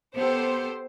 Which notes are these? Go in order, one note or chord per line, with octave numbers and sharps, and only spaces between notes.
B3 G4 A4 C5